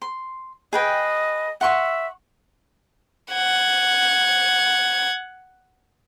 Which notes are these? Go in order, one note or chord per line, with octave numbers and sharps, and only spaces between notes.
C6
G#4 B4 D#5 G5
E5 F#5 C6 C#6
F#5 G#6